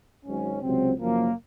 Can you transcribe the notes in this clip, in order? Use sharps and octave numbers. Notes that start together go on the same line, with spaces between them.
G#1 G#2 F#3 C#4
C#2 C3 F#3 C4
F#1 F#2 F3 A#3